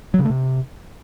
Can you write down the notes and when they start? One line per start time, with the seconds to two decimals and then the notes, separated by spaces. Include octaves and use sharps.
0.14 F#3
0.19 C#3
0.25 A3
0.30 C3